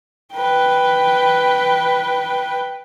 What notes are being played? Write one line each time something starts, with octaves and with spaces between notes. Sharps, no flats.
B4 G5